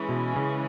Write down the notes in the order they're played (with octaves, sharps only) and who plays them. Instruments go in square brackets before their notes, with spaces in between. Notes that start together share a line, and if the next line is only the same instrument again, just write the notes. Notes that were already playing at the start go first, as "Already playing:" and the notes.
Already playing: [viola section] E3 G#3 C#4
[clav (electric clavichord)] B2
C#3